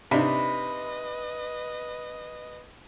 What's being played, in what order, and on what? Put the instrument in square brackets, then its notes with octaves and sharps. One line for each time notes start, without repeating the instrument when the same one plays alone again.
[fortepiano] C3 D4 D#4 [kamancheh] B4 D#5 [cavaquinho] B5